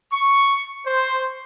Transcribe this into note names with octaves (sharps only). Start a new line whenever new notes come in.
C#6
C5